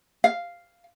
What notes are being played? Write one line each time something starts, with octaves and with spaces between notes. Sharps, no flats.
F5